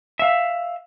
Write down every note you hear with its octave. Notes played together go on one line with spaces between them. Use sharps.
E5 F5